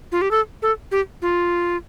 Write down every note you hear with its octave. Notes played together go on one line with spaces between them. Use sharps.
F4
G4
A4
A4
G4
F4